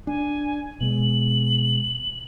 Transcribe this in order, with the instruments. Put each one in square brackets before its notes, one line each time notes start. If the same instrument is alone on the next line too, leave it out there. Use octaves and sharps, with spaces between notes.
[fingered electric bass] D4 [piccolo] G#5
[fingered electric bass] B2 G#3 [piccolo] F#7